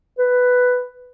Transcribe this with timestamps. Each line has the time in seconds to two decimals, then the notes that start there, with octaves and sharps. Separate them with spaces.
0.19 B4